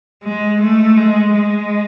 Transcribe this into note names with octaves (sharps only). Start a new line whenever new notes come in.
G#3
A3
G#3
G#3